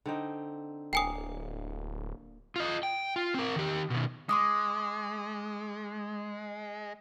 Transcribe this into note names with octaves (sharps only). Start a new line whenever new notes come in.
D3 C4 D#4
D1 A#3 G5 G#5 D#6
F4 D#5
G5
F4
C4 A#4
D#3 G4
B2 D#3
G#3 C6 D6 D#6